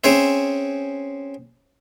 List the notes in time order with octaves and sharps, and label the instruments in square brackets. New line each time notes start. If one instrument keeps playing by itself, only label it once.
[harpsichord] C4 C#4 G#4 C5 E5